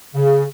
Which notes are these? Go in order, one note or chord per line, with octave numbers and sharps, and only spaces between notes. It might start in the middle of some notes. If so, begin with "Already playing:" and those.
C#3